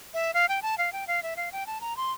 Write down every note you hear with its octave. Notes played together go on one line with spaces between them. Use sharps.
E5
F5
G5
A5
F5
G5
F5
E5
F5
G5
A5
A#5
C6